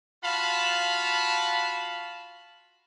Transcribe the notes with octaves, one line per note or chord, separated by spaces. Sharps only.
F4 F#4 F5 A5 B5